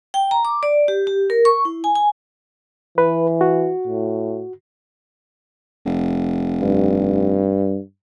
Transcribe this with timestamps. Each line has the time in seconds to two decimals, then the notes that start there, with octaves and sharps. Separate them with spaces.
0.14 G5
0.31 A#5
0.45 D6
0.63 D5
0.88 G4
1.07 G4
1.30 A#4
1.45 C#6
1.65 E4
1.84 G#5
1.95 G#5
2.98 E3 B4
3.41 F#4
3.87 A2
5.86 F1
6.62 G2